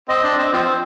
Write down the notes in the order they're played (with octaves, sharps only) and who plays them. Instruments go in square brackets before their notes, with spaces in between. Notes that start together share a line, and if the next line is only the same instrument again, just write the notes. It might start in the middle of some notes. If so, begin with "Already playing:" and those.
[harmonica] C4 [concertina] D#5
[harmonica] D4
C4
F3 C4